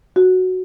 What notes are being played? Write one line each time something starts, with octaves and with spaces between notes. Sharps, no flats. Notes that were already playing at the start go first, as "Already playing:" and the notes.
F#4